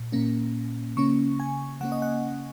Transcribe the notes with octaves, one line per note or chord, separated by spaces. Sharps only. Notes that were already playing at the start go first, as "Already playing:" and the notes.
Already playing: A#2
A#2 A#3 C#4
C#3 A#3 C#4 C#6
G#5
C#3 A#3 C#4 F#5
D#5
F#5